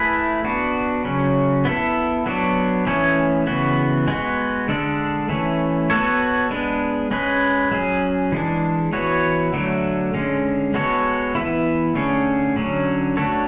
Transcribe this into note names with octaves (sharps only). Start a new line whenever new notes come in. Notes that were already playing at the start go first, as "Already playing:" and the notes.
Already playing: A3 E4 G#4 B4
B3 D4 F#4
C#3 F#3 C#4
B3 E4 A4
F#3 B3 D4 F#4
E3 A3 C#4 G#4 C#5
C#3 E3 B3 F#4
G#3 B3 F#4
D3 G#3 D4 A4
E3 A3 C#4
B3 F#4 A4 C#5
G#3 B3 D4
G#3 C#4 G#4 B4
F#3 C#4 G#4
E3 G#3 D4
E3 B3 F#4 C#5
D3 F#3 A3
D3 G#3 C#4
G#3 B3 F#4 A4 C#5
E3 B3 E4
D3 A3 C#4 G#4
D3 F#3 C#4
A3 D4 F#4 A4 C#5